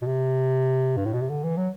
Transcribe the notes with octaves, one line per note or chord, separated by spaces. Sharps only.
B2
C3
G2
A2
B2
C3
D3
E3
F#3